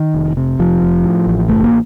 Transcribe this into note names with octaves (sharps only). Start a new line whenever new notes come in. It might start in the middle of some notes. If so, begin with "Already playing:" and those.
Already playing: D#3
F1
C3
F1 F3
F1
A2
A1
F#1 A3
A#3